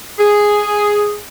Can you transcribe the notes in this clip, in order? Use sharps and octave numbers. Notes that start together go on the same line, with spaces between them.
G#4